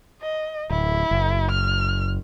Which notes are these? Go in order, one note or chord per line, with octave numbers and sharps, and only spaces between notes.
D#5
D1 E4
F#1
F6